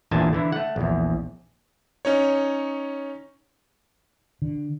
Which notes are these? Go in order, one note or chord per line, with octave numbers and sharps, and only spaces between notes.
A1 E2 A#2 D3 G#5 A5
D3 E3 E4
A3 F#5
A#1 E2
C#4 D#4 C#5
D3